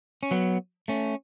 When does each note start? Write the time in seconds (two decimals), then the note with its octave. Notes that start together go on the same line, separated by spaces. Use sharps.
0.23 C#4
0.31 F#3 B3
0.88 A3 C#4